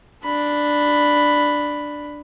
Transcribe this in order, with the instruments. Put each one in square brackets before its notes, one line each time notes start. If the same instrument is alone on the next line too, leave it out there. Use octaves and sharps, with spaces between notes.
[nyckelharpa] D4 B5